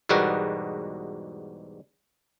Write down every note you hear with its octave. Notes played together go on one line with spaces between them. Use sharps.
E2 G#2 B2 G3 F#4 A#4